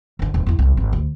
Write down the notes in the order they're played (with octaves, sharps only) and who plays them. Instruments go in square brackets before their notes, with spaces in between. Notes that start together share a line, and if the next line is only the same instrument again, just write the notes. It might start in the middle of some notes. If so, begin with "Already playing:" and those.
[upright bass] F#1 D3
D#1
E2 E4
C2
G#1
D2